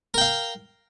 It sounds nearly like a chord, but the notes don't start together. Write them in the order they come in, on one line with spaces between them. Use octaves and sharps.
A#4 G5 F5